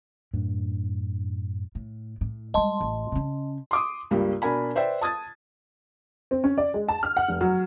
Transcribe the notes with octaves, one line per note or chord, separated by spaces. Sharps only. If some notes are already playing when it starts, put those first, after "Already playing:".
F#2 A2 D4
A2
A2
G3 G#3 D#5 A5 C6
A1
C#3 C#4
C6 D6 D#6
C#2 G2 G3 A#3
B2 D4 A#4 G#5 B5
B4 C5 D5 E5 G5
A5 D#6 G#6 A6
C4
C#4
D5
G#3
A5
F6
F#5
F1
F#3